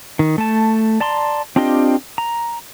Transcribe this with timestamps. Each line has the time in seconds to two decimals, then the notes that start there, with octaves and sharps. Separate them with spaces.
0.19 D#3
0.38 A3 A5
1.00 D5 A5 A#5 C6
1.56 C4 D4 F4 G4 D#5
2.18 A#5